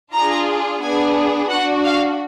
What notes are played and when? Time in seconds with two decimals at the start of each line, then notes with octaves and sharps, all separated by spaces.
0.14 D4 F4 G#4 A#5
0.82 B3 D4 G#4 G#5
1.50 D4 F#4 F#5
1.85 F5